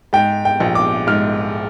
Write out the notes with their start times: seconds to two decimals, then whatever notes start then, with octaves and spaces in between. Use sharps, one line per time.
0.13 G#2 G5
0.45 G5
0.60 A#1
0.75 D6
1.07 G#2 F6